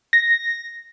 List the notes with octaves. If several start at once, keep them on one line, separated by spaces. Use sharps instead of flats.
A#6